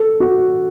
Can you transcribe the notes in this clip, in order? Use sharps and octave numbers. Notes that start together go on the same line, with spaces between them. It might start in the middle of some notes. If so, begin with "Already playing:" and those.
Already playing: A4
F#4